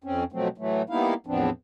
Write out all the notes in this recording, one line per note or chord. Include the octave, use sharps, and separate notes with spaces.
F2 C4 C#4
B2 F3 F#3 A3 C4
A2 E3 F#3 A3
G3 A#3 B3 D#4 E4 F5
E2 A2 F3 B3 C4 D4